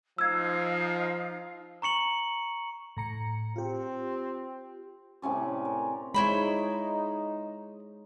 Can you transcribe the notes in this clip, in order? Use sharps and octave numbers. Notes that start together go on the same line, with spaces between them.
F3 D#4 F5 E6 G#6
A#5 C#6 C#7 F#7
A2 A#5 C#7
C4 F4 G4
A2 C3 C#4 D5
A#4
G#3 D#4 E4 C5 C#5 B5